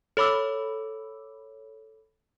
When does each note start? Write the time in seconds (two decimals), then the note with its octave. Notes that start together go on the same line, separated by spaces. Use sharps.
0.17 A4 C#5 B5 D6 E6